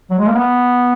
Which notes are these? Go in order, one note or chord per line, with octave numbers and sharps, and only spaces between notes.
F#3
G#3
A#3
B3